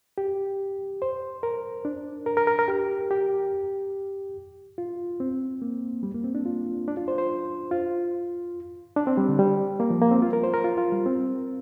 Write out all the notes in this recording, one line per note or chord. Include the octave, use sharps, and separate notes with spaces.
G4
C5
A#4
D4
A#4
A#4
A#4
A#4
G4
G4
F4
C4
A#3
G3
A#3
C4
D4
F4
D4
F4
C5
C5
F4
D4
C4
G3
D3
G3
A#3
F3
A#3
C4
F4
A#4
C5
A#4
F4
F4
G3
C4